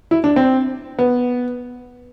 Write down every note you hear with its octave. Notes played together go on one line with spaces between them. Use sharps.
E4
D4
C4
B3